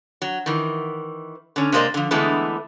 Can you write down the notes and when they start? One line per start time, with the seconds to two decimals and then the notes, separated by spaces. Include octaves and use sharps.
0.22 F#3
0.46 D#3 E3
1.56 D3 C#4
1.72 C3 G#3 A#3 C5 D5 D#5
1.94 D3 F3
2.11 D3 E3 G#3 A3 B3 E4